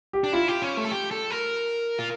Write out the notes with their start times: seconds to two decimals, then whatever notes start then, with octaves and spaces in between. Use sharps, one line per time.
0.13 G4
0.24 D4
0.33 E4 F4
0.48 G4
0.62 C#4
0.77 A3
0.85 A4
0.91 G4
1.11 A4
1.30 A#4
1.99 F4